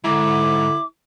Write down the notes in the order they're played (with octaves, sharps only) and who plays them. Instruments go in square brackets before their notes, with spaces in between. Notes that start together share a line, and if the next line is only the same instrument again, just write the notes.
[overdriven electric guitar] G#2 [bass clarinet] D3 [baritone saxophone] E4 [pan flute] D6